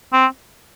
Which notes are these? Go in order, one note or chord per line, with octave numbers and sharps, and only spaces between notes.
C4